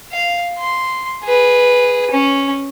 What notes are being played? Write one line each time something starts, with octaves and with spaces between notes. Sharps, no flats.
F5
C6
G#4 B4
C#4